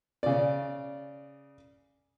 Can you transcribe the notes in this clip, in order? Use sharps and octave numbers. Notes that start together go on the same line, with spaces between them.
C#3 D5